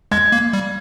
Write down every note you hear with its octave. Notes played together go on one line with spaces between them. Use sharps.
G#3 G#6
A#3
G3